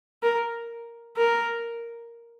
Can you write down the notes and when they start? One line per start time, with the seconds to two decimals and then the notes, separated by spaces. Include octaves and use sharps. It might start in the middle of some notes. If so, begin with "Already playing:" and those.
0.23 A#4
1.17 A#4